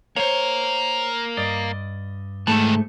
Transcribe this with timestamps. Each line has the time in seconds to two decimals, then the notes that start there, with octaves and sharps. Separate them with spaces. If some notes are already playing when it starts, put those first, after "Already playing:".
0.16 A#3 A#4 C5 C#5
1.37 G2 D5 D#5
2.47 G#2 D#3 E3 A3 A5